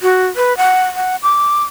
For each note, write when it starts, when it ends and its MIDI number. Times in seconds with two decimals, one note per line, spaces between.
0.02 0.26 66
0.36 0.56 71
0.57 0.83 78
0.95 1.16 78
1.23 1.63 86